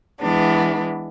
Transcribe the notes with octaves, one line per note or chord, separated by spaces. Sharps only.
E3 G#3 B3 D4